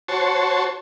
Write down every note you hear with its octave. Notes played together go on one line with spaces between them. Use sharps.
F#4 C5 C#5 A5